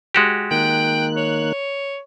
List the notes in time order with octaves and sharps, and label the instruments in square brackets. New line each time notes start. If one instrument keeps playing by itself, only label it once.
[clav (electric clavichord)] G#3 F#4 G4
[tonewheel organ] D#3 A#3 F#6 [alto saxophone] G5
[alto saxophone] C#5